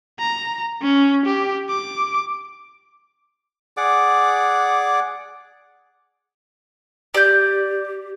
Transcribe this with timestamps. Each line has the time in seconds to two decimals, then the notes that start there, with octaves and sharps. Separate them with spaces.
0.19 A#5
0.82 C#4
1.26 G4
1.69 D6
3.77 G#4 D5 F#5 D6
7.14 G4 D5 G6